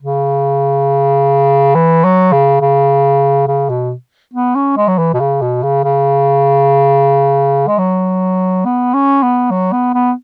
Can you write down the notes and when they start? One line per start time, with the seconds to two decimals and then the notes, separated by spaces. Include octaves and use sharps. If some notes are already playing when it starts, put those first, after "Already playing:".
0.02 C#3
1.75 E3
2.04 F#3
2.32 C#3
2.61 C#3
3.48 C#3
3.69 B2
4.33 B3
4.55 C#4
4.77 G#3
4.88 F#3
4.98 E3
5.14 B2
5.20 C#3
5.42 B2
5.63 C#3
5.84 C#3
7.68 G#3
7.78 F#3
8.65 B3
8.94 C#4
9.23 B3
9.51 F#3
9.72 B3
9.94 B3